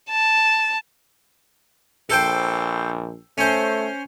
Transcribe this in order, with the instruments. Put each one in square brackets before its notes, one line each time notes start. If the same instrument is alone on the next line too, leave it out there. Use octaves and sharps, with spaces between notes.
[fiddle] A5
[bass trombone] A#1 [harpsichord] A4 C5 G5
[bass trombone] A3 [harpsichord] C#4 C5